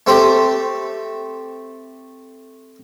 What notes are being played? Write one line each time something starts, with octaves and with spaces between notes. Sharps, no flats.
A3 C4 G4 C5